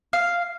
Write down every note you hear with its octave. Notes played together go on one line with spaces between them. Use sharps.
F5